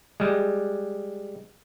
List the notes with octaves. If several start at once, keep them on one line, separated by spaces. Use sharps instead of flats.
G3 G#3